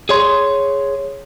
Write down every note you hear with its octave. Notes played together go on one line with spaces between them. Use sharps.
G#4 C#5 C6